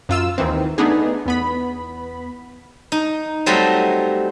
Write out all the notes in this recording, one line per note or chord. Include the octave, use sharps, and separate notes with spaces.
F#2 F4 E6
D#2 D#3 E3 C4
A3 B3 D4 D#4 G#4
E2 B3 B5
D#4
F#3 G3 A3 C4 D#5